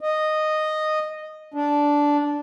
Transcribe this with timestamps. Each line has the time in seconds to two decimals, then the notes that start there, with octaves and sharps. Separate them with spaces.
0.01 D#5
1.54 D4